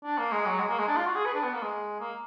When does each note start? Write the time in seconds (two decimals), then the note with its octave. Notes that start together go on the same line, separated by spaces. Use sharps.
0.04 D4
0.18 A#3
0.32 G#3
0.46 F#3
0.60 G#3
0.69 A#3
0.79 G#3
0.88 D4
0.97 F4
1.06 F#4
1.15 G#4
1.26 B4
1.34 D4
1.43 B3
1.54 A#3
1.62 G#3
2.00 A#3